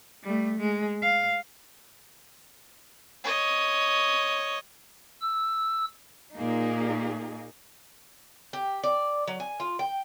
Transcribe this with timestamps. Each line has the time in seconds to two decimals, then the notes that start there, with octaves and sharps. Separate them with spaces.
0.24 G3 A3
0.58 G#3
1.02 F5
3.24 C#5 D#5
5.21 E6
6.36 A#2 A#3 D#4 G#4
8.53 G4
8.83 D5
9.27 F#3
9.40 G#5
9.60 F4
9.79 G5